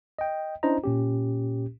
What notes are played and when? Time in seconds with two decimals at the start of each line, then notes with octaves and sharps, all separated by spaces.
0.19 D#5 G5
0.63 C#4 D4 E4 C5 D#5 A#5
0.84 A#2 C#4 G4